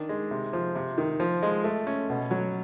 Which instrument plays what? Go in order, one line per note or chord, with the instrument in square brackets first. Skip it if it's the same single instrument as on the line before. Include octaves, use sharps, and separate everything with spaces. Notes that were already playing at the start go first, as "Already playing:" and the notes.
Already playing: [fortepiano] D#3 D4
G#3
C3
F3
C3
D#3
F3
G#3
A3
C#4
B2
F#3